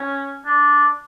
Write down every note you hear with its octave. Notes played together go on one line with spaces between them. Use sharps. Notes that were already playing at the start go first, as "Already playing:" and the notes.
Already playing: C#4
D4